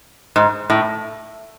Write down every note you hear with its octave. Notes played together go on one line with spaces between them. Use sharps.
G#2
A2